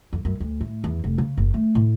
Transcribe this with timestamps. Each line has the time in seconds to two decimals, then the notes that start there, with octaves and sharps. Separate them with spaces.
0.13 F2
0.25 F#2
0.40 D2
0.61 A2
0.84 E2
1.04 F1
1.18 C#3
1.37 F#1
1.54 A3
1.75 A2